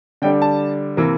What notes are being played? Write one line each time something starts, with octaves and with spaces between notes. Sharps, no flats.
D3 G3 D4 G5
A5
C3 E3 A#3